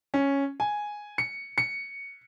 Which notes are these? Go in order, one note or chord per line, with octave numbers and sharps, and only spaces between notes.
C#4
G#5
C#7
C#7